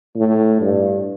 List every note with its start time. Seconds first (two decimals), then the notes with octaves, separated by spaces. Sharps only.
0.16 A2
0.61 G2